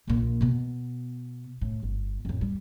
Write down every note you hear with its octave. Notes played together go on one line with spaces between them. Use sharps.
A#1 A#2
B2 B3
A2
G1
A1 F2
G3